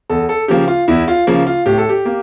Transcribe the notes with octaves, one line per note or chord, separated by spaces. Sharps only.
E2 A4
A4
C#3 F3 A#3 G4
F4
E2 E4
F4
C#3 F3 A#3
F4
A2 G4
A4
G4
A#3